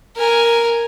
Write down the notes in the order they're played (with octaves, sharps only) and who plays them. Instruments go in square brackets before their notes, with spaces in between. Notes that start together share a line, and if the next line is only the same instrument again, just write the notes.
[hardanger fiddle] A#4 G#5